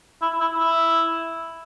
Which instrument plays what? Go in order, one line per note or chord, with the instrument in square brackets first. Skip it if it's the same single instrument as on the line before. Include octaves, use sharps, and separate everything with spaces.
[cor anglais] E4
E4
E4